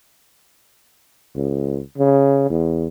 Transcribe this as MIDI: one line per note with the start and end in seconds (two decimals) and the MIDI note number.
1.36 1.80 37
1.98 2.46 49
2.50 2.87 40